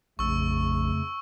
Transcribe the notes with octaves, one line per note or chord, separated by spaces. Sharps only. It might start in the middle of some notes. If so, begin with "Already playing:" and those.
A#1 F2 C#3 A3 C#6 E6